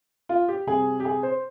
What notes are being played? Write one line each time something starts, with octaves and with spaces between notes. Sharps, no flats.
F4
G4
C3 G3 G#4
G4
G#4
C5